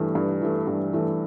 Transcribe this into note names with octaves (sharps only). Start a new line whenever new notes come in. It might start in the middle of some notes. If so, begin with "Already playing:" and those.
Already playing: G2 E3 A3
G2
E3 A3
G2
E3 A3